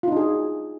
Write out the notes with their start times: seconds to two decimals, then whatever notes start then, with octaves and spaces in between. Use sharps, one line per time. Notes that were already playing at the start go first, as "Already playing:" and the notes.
0.03 F4
0.08 D#4
0.12 D4
0.17 G#4
0.21 F#4